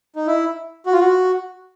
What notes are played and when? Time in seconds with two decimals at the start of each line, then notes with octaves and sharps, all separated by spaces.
0.16 D#4
0.27 E4
0.86 F#4
0.93 F4
1.01 F#4